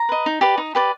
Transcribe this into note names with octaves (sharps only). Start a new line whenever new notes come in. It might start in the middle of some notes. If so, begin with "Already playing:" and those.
Already playing: A#5
B4 D#5
D#4
G4 B4 D5
D#4
G4 B4 D5